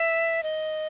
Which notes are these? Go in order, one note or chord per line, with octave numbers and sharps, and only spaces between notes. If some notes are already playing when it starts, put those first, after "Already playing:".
Already playing: E5
D#5